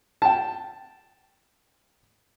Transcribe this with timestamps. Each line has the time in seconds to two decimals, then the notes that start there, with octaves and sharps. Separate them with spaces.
0.22 G5 A5